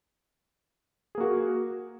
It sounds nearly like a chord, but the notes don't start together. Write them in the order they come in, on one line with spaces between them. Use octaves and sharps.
G#4 A#3 F#4 A#4